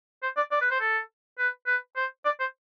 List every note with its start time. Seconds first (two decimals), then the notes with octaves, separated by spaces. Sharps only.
0.23 C5
0.37 D5
0.51 D5
0.61 B4
0.71 C5
0.80 A4
1.39 B4
1.66 B4
1.96 C5
2.25 D5
2.40 C5